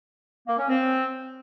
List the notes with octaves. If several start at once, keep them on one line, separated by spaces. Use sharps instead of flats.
A#3
C#4
C4